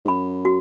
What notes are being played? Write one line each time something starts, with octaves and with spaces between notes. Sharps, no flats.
G#2
F#2 B5
F#4